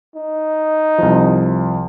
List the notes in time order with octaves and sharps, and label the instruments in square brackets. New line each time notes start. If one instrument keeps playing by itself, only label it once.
[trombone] D#4
[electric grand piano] C2 F3